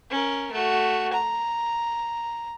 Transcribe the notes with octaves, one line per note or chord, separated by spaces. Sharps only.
C#4 A#4
A3 F#4
A#5